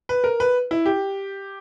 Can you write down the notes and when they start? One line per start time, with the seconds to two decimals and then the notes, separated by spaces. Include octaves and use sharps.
0.09 B4
0.24 A#4
0.40 B4
0.71 E4
0.86 G4